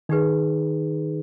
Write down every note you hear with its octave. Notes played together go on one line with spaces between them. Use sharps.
D#3 D#4 G#4 B4